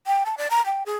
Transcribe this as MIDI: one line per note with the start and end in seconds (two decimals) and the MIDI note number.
0.07 0.24 79
0.26 0.35 81
0.38 0.48 74
0.51 0.64 82
0.66 0.83 79
0.86 0.97 68